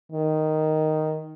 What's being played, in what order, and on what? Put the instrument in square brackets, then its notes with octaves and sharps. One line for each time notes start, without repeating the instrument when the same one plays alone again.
[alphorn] D#3